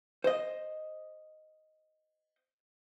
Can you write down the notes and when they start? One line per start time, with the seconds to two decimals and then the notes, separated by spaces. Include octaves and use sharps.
0.24 C5 D#5